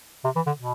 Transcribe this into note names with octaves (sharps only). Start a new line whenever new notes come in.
C3
E3
D3
B2